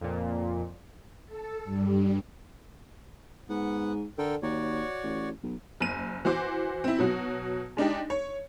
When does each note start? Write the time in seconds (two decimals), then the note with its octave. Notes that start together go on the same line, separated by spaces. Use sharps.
0.01 F2 A#2
1.26 A4
1.64 G2 G3
3.49 G#2 B3 F#5
4.18 D3 A4 A#4 G5
4.43 D#2 F#4 C#5 D5
5.03 A1
5.43 B1
5.80 F#1 D#7
6.25 E3 F#4 C5 D6
6.84 C4 E4
6.99 B2 F#3 F#4
7.77 G#3 D4 D#4 G4
8.10 C#5